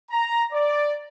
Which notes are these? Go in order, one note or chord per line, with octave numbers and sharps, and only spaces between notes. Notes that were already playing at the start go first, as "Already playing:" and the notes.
A#5
D5